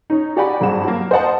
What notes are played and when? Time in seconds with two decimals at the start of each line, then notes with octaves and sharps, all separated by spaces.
0.10 C#4 D#4
0.36 F#4 G4 D5 F#5 G#5 B5
0.61 G#1 G2 D4 G#4 F#5 E7
0.84 F#3 A#3
1.11 C5 D#5 F#5 A5